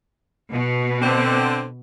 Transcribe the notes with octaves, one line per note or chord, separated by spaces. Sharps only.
B2
D3 C4